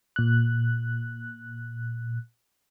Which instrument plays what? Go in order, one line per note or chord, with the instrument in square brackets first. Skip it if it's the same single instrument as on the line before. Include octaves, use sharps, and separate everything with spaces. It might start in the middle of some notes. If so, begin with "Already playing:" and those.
[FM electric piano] A#2 F#6